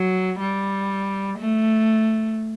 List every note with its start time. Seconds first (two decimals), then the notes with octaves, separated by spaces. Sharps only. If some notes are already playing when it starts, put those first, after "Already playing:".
Already playing: F#3
0.39 G3
1.38 A3